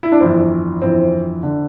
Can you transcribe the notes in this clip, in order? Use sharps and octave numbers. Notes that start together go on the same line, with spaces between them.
E4
D4
G1 F2 E3 C4
G1 F2 E3 C4
D3